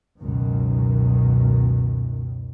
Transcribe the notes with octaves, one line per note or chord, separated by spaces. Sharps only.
C#2 F#2 B2 D#3